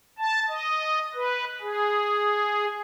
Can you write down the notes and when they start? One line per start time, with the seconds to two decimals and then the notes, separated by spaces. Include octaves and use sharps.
0.19 A5
0.49 D#5
1.14 B4
1.61 G#4